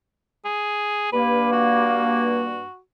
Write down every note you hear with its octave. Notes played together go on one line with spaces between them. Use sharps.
G#4
G2 A#3 B4
F#4